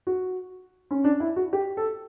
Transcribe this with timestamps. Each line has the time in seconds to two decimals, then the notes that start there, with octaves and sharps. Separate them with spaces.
0.07 F#4
0.91 C#4
1.04 D4
1.20 E4
1.36 F#4
1.53 G4
1.77 A4